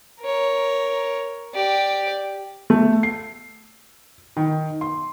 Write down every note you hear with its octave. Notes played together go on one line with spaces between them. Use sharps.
A#4 C#5
G4 D5
A3
C7
D#3
C6